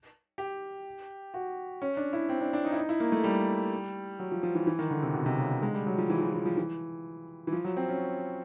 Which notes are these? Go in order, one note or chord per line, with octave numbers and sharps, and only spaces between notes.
G4
F#4
C#4
D4
E4
C4
D4
D4
D#4
E4
D#4
E4
A#3
A3
G3
F#3
F3
F3
E3
E3
D#3
D3
C3
B2
C3
C#3
D3
G#3
G3
F#3
F3
E3
F3
E3
E3
F3
E3
E3
F3
F#3
C4
C#4